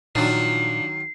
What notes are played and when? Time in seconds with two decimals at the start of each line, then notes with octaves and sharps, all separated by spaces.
0.15 A#2 D#3 F3 F#3 D4 C7